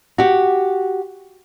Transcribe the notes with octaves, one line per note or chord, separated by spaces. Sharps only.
F#4 G4